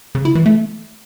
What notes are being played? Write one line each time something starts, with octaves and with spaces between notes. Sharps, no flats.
C#3
E4
E3
A3